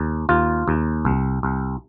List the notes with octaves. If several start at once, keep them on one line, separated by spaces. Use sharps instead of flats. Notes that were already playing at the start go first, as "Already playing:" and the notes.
Already playing: D#2
D#2 F4
D#2
C2
C2